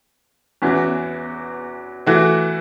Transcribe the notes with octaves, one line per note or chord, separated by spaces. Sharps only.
E2 E3 C#4 F#4
E3 A3 F#4